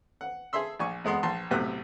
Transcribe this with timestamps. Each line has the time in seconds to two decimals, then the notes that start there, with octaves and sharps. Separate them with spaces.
0.21 F#5
0.53 G#4 A4 E5 C6 E6
0.79 A#1 D5 G#5 C#6
1.04 E2 G#3 B3 C6
1.23 A#1 A5 C6
1.51 B1 A2 C3 A3 F#6